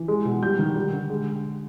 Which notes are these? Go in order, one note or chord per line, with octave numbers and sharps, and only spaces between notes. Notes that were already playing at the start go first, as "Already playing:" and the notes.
Already playing: E3
G#3
B2
G3 G6
D#3
G3
D3
G#3